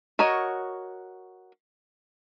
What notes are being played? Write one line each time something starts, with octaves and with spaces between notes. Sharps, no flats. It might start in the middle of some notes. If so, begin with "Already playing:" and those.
F#4 A#4 C#5 D#5